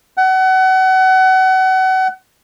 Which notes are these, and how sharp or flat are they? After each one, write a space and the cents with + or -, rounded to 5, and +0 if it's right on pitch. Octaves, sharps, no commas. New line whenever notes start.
F#5 +30